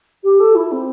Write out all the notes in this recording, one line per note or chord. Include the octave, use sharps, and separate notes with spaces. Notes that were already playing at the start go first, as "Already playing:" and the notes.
G4
A4
E4
C4